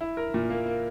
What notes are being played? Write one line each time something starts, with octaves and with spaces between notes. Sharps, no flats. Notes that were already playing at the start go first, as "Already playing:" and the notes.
E4
A#4
A#2
A#3
A#3